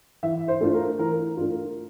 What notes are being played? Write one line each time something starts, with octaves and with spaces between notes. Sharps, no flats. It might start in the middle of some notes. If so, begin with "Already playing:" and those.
E3 E5
C5
A3 D4 F4
A#4
E3 A#4
A3 D4 F4
A#4